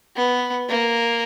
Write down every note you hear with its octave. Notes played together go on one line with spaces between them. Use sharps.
B3
A#3